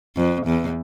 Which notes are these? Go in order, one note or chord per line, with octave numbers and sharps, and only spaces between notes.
F2
E2